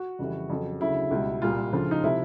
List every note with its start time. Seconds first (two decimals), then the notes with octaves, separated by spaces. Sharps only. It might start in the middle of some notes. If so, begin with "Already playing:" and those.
Already playing: F#4
0.19 F2 C#3 E3 G3
0.50 F2 C#3 F#3
0.81 D2 C#3 F#3 E4
1.11 C#2 B2 G3
1.42 C2 A#2 G3 F4
1.72 D2 C#3 F3
1.91 D#4
2.04 C3 F3 E4